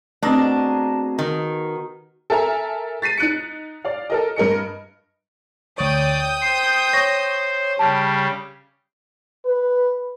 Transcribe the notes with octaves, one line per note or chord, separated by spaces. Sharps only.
B2 A3 C4 D4 G#4 A#5
D#3
A4 A#4 E5 G#5 A#5
A6 B6 C7 D#7
D#4 F#6 C#7
D5 F5
A4 A#4 D#5
G2 A#4 D#5 C#7
D2 C#5 D5 G5 D#6 G6
C5 C7
C#5 A#6
C#3 G3 A5
B4